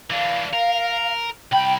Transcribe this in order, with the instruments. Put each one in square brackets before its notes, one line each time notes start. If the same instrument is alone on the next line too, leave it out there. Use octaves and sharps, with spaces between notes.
[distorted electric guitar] E3 D4 [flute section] F5
[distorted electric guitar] A#4
[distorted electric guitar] C2 B5 [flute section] G5